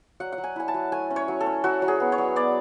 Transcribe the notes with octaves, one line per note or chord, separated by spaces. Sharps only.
F#3 F#5
F#5
F#3
G#5
E4 G#5
A5
F#3
A3 G#5
C#4
C#5
F#3
A4
C#4
F#3 F#4
F#3
G#4
B3
C#5
F#3
B3 D5